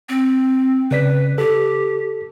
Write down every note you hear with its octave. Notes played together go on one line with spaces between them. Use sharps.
C4
C#3 B4 D5 B6
G4 A4